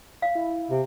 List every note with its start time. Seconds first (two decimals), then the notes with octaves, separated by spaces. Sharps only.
0.22 F5
0.35 E4
0.71 C3